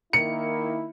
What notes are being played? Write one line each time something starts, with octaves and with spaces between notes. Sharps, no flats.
D#3 A#3 E4 C#7